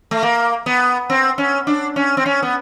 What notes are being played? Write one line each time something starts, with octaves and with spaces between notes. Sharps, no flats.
A3
A#3
B3
C4
C#4
D4
C#4
C4
C#4
B3